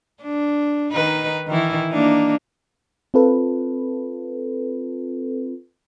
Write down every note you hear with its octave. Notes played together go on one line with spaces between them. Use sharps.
D4
D#3 D#4 B4
D#3 E3 E4
A#3 D4 D#4
C4 F4 A4 B4